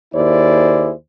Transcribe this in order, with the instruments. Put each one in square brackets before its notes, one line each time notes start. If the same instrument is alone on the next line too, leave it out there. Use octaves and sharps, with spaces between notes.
[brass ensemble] D#2 E4 G#4 C5 D5